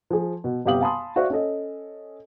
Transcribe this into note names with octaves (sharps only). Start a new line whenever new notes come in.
F3 G#4
B2
G1 C3 G4 F5 D#6 F#7
F5 G#5 A5 B5 C6 D#6
F#4 C5 D5 E5 F5
C#4 A4 D#5